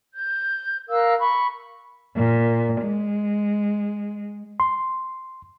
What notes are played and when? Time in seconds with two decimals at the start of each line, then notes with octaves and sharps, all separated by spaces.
0.13 G6
0.89 A#4 F5 E6 F#6
1.20 B5 C#6
2.16 A#2
2.81 G#3
4.60 C6